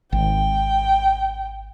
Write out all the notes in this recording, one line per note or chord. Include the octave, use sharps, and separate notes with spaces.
G#1 G5